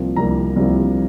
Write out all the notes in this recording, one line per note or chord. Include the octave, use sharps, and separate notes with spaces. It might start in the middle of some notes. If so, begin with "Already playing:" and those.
Already playing: C2 C3 F3 A#3
C2 C3 F3 A#3 A#5
C2 C3 F3 A#3